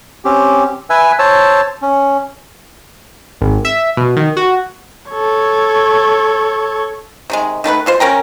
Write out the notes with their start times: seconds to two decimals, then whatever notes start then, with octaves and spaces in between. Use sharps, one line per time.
0.25 C4 C#4 G4
0.90 B4 E5 G#5 E6
1.19 C5 C#5 A5 E6
1.82 C#4
3.41 G#1
3.65 E5
3.97 B2
4.16 D#3
4.37 F#4
5.11 A4 C#5
7.30 C3 D#3 G#3
7.64 D#3 A3 F4 B4
7.86 B2 F4 C5
8.00 C#4 A#4 G5 A#5